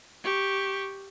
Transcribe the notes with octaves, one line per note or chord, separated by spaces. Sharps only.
G4 C#6